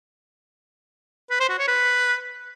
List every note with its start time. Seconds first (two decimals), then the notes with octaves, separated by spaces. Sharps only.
1.31 B4
1.40 C5
1.49 F#4
1.59 C#5
1.68 B4